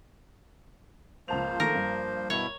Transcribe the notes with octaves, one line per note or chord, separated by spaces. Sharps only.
C#2 F3 A#3 C5 A5 F7
D#3 A3 A#4
G2
B2 E4 C#5